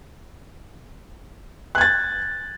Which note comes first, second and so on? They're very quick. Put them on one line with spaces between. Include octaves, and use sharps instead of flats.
F#6 G#6 A6